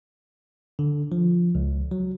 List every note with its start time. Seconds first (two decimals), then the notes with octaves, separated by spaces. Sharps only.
0.79 D3
1.12 F3
1.55 C#2
1.91 F#3